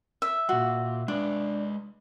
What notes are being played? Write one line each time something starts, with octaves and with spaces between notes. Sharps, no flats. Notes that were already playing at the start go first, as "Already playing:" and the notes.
E5
A#2 F4 F#4
G#3 D4 B4